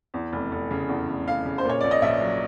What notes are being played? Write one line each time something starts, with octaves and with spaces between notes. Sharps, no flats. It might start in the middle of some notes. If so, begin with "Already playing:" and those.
E2
F1
F1
C#3
E2
F1
F1 F5
C#3
C5
A#2 C#5
A#1 D5
D#5
A#1 E5
F#3